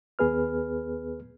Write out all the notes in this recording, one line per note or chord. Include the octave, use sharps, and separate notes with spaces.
D#2 B3 G#4 B4 F6